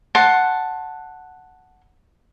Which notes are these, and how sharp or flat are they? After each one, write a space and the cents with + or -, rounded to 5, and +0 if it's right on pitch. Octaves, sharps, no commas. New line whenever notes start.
F#5 +0 A5 +0 C6 +20